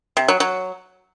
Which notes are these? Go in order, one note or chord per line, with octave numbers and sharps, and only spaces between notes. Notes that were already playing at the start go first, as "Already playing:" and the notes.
C3
F#3
F#3